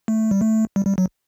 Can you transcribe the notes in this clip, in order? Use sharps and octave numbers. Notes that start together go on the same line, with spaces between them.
A3
G3
A3
G3
G3
F#3